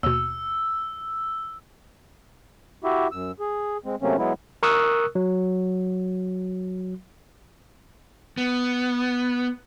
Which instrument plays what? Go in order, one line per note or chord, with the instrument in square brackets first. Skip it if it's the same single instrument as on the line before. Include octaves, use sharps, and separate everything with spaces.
[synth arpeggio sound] D#2 B2 [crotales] E6
[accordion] E4 F#4 G4 E5
F#2 E6
G#4
G#3 C4
C3 F#3 A3 A#3 C4 C#4
F#3 G#3 B3 E4
[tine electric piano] A#4 C#6 D#6 E6 F#6
F#3
[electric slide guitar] B3